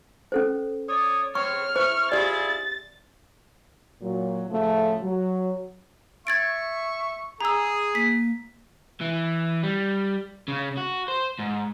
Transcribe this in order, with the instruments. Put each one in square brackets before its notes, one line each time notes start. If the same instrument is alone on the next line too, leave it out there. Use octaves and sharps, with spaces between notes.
[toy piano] C#4 A4 C5
[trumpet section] C#5 D5 D#6
[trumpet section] C4 C#5 [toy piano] C#6 [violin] F6
[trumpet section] E4 C#6 [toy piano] C5
[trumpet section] E4 F4 G#4 [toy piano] G4 D5 [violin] A6
[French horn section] A#2 F#3
A2 C#3 F3 A3
F#3
[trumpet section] E5 C#6 [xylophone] G#6 A6 D7
[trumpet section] G#4 [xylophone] A#5 E6
[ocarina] A#3 [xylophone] B6
[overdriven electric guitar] E3
G3
C#3
F#4
C5
G#2